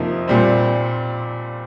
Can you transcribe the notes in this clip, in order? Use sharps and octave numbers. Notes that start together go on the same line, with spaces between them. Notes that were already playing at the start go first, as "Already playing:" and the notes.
Already playing: F2 C3 F3 A#3 D#4
A#2 G3 C4